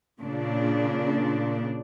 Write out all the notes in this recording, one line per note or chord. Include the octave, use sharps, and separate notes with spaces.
A#2 C#3 D4